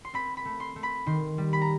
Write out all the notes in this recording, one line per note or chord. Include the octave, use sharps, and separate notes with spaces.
C6
C4 B5
B5
A3
C6
A3
B5
D#3 C6
G3
B5
A#5